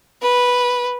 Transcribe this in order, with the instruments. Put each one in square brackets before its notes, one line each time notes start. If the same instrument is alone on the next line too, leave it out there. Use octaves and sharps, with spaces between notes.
[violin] B4